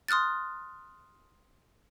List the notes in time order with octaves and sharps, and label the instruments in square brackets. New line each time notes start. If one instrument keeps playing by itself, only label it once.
[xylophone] C6 D#6 F6 F#6 A6